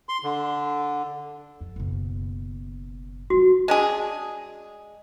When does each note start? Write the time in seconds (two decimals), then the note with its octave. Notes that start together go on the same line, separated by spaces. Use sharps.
0.09 C6
0.24 D3
1.60 F2
1.76 F#1 B2
3.30 E3 G3 F#4
3.68 G#3 D4 G#4